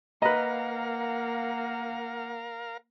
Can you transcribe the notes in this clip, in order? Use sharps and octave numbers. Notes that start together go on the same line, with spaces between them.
A#3 A#4 B4 D#5 F5 F#5 A#5